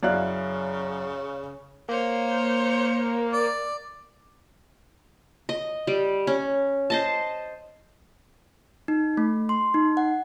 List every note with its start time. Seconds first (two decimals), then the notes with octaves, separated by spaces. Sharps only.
0.03 F#2 C#3 E4 F#4 C#5 D5 F5 F#6
1.89 A#3 C5 C#5
3.33 D5
5.49 D#5
5.87 G3
6.27 C#4
6.90 C5 D#5 A5
8.88 D#4
9.17 A3
9.49 C6
9.74 D#4
9.97 F#5